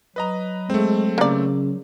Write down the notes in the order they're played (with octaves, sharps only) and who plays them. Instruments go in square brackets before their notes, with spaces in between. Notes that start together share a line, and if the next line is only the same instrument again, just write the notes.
[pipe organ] F#3 [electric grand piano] B4 D#5 A#5
[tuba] G#3 [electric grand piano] A3 C4
[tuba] C#3 [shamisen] A#3 D5